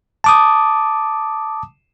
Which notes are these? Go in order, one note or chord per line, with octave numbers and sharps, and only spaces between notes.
A5 D6 D#6